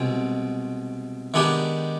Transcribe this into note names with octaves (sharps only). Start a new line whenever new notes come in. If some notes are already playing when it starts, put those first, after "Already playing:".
Already playing: C2 B2 G#3 C4
D#3 G#3 B3 D4 G4